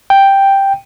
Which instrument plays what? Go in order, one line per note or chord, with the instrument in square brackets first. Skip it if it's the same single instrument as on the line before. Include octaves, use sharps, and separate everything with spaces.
[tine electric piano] G5